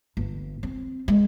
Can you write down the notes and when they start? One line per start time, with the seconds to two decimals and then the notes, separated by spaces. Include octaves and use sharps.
0.17 G1
0.63 C4
1.08 G#3